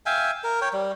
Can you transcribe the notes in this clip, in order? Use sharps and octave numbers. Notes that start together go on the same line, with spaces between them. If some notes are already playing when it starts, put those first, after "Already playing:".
E5 F5 G5 G#5
A#4
C#5 G5
G3